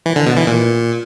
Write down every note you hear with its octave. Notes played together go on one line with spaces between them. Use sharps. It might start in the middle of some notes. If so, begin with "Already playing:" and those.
E3
D3
B2
E3
A#2